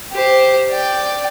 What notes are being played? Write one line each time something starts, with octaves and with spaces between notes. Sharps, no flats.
G4 C5
D5 G5